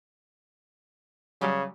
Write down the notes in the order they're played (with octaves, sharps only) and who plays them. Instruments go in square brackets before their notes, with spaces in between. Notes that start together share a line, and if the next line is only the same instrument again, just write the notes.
[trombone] C#3 [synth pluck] F#3 G3